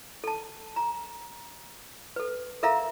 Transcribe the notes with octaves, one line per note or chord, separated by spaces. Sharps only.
A4 A5
A#5
A4 B4
A4 A#4 E5 F5 A#5 B5